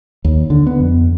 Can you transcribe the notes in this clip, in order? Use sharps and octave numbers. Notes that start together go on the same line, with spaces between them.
D#2
D3
B3
F2